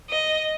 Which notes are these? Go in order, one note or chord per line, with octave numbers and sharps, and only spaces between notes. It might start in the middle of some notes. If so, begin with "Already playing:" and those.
D#5